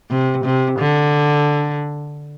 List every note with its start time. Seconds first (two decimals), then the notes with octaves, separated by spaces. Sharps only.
0.11 C3
0.45 C3
0.80 D3